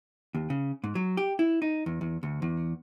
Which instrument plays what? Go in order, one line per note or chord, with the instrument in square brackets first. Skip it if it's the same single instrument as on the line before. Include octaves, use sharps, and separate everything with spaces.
[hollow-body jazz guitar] D#2
C#3
G#2
F#3
G4
E4
D#4
E2
E2
D2
E2